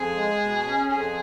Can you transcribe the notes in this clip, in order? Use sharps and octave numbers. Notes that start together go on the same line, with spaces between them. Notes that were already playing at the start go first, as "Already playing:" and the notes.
Already playing: F2 G#4
G#3
B2
C#4
F2 G#4